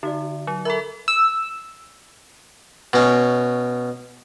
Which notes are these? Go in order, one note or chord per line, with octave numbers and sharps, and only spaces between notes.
D3 D#4 F#4 D5
F#3
A4 A#4 E5 A#5 B5
E6
B2 C#4